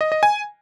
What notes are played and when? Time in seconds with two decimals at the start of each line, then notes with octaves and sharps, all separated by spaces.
0.01 D#5
0.12 D#5
0.23 G#5